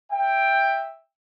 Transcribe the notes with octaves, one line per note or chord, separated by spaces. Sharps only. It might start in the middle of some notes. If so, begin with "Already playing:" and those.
E5 G5